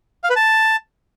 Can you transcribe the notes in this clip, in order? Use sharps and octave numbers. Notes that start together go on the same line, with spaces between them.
F5
B4
A5